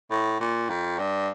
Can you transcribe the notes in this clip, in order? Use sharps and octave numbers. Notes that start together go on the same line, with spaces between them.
A2
A#2
F2
G2